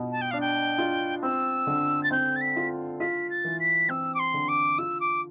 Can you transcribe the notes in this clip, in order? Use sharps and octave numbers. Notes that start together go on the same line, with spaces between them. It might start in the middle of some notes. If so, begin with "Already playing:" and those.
Already playing: B2 F4
A5
G5
D4 F5
G5
F4
C4 E6
D3
A6
C4 G6
A6
B6
F4
F4 B6
A6
E3
B6
C4 E6
D6
C6
D3
D6
F4 E6
D6